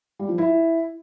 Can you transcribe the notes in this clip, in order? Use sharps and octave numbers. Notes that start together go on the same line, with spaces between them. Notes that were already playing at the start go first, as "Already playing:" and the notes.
G3
F3
E4